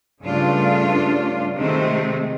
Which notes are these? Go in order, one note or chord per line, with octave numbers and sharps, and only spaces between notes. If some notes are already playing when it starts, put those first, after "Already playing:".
G2 C#3 A3 D4 F4
C3 D#3 G#3 A3 C4